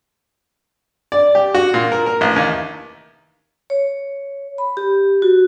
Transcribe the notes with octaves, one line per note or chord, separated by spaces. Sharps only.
D5
G4
F#4
A#2
A#4
A#4
A1
D#2
C#5
B5
G4
F#4